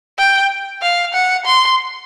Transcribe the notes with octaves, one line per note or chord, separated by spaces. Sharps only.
G5
F5
F#5
C6